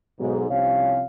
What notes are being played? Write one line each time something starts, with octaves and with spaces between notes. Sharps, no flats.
B1 G#2
C2 C3 F3 C#4 C#5 F5